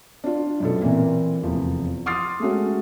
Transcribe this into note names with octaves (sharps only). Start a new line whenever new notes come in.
D4 F4
F#2 B2 A4
A#2 E3 A#3 C4
F1 E2 F3
C6 D6 D#6 F6 A6 C7
G#3 A3 C#4 F#4